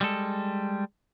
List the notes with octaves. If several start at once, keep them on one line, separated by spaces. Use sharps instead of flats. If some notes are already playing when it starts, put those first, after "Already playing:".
G3 G#3 A4